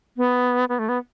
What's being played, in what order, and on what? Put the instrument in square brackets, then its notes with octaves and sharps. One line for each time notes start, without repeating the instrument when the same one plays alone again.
[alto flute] B3
B3
A3
B3